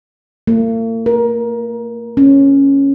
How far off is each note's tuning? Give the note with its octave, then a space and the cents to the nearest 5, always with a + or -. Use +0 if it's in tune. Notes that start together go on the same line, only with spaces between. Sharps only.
A#3 -45
A#4 +25
C#4 -5